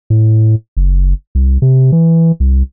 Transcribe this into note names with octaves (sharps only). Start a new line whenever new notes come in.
A2
F#1
C2
C3
E3
C2